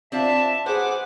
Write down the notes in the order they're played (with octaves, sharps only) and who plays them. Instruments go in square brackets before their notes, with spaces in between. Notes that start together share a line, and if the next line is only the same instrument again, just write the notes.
[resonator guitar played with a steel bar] C4 D4 F4 [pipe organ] E5 A5
[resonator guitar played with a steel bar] F#4 B4 [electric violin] G#4 F#5 [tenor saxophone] C5 [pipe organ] D6